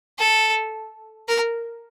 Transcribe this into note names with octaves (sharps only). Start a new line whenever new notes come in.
A4
A#4